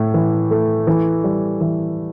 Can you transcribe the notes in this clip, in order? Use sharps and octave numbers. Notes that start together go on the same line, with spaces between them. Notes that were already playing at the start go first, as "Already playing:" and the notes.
Already playing: A2 A3
E3
A3
E3
G3
E3